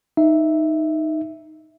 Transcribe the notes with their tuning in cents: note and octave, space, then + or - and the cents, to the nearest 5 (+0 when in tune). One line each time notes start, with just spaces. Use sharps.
D#4 +0 E5 +0